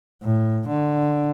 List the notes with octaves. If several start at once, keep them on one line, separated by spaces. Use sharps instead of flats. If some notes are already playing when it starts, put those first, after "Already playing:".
A2
D3